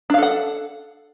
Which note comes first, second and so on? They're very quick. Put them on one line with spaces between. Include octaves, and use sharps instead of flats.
D4 F5 A4 F#5